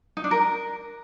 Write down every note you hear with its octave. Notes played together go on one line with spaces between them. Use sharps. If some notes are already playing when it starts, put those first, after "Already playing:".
D#4
D4
A#4